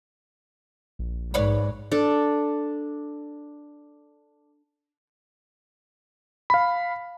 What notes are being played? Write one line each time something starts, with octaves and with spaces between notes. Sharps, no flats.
A#1
G#2 B4 C#5 D5
D4 A4
F5 B5